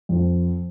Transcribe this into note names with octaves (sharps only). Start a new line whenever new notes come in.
F2